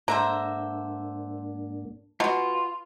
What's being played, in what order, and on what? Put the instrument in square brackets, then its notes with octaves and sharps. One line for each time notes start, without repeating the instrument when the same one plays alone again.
[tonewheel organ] G#2 A#3 D4 [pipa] D3 [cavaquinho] C5 E5 A#5
[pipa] B2 [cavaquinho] D#4 F#4 [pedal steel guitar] F4